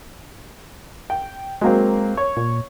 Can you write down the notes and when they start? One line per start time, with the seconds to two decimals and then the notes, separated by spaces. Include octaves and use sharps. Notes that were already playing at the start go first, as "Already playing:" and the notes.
1.10 G5
1.61 F#3 G#3 A#3 C4
2.17 C#5
2.37 A#2